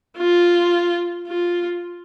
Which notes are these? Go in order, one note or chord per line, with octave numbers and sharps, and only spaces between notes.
F4
F4